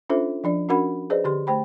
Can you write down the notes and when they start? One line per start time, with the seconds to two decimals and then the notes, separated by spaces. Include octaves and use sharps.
0.10 C#4 D4 F4 A4 C5 E5
0.44 F3 D4 D5
0.69 C#4 D4 F#4 A#4 F#5 B5
1.10 G#4 B4 C5 D5 D#5
1.24 D3 G4 C6
1.47 A3 C5 G5 B5